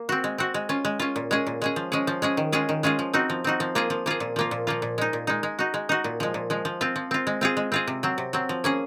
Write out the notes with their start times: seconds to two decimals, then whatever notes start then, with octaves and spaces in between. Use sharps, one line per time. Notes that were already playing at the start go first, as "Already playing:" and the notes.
Already playing: A#3
0.09 C4 F#4
0.24 G#3
0.38 C4 F#4
0.54 G#3
0.69 C#4 F4
0.85 G#3
1.00 C#4 F4
1.16 A#2
1.31 G#3 C#4 G#4
1.47 A#2
1.62 G#3 C#4 G#4
1.76 F3
1.92 G#3 C#4 G#4
2.07 F3
2.22 G#3 C#4 G#4
2.37 D#3
2.52 G#3 C#4 F4 G#4
2.69 D#3
2.83 G#3 C#4 F4 G#4
2.99 F3
3.14 C4 D#4 F#4
3.30 F3
3.44 C4 D#4 F#4
3.60 F3
3.75 A#3 F4 G#4
3.90 F3
4.06 A#3 F4 G#4
4.20 A#2
4.36 F3 A#3 F4
4.51 A#2
4.67 F3 A#3 F4
4.82 A#2
4.98 G#3 D#4
5.13 A#2
5.27 G#3 D#4
5.43 G#3
5.59 D#4 F#4
5.74 G#3
5.89 D#4 F#4
6.04 A#2
6.20 F3 G#3
6.34 A#2
6.50 F3 G#3
6.65 F3
6.81 C4 F4
6.96 F3
7.11 C4 F4
7.27 G#3
7.41 C4 F4 G#4
7.57 G#3
7.72 C4 F4 G#4
7.87 C3
8.03 F#3 C4
8.18 C3
8.33 F#3 C4
8.49 F3
8.64 A#3 C#4 G#4